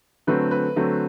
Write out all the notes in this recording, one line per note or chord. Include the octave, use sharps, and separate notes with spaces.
D3 F#3 A3 C4 B4
B4
D3 F#3 A3 C4